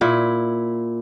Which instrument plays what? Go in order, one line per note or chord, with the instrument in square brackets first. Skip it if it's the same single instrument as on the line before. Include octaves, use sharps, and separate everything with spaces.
[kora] A#2 E4